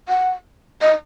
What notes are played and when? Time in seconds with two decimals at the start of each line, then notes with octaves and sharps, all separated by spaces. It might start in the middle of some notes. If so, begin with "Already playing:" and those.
0.08 F#5
0.82 D#5